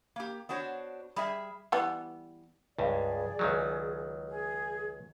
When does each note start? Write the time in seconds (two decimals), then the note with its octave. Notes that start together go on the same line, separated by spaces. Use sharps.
0.16 A#3 G4
0.49 B3 D4 F#4 C5 C#5
1.16 G3 G#4 E5
1.72 E3 G3 B3
2.79 C#2 G2 G#4 D5
3.39 C#2 D#3 F#3
4.28 G#4